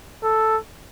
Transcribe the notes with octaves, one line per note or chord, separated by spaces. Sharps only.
A4